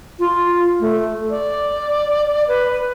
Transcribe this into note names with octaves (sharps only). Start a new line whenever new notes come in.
F4
A3
D5
B4